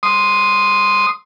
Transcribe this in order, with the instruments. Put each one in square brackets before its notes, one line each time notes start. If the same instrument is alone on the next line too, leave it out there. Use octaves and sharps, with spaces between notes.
[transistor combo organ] C6 D#6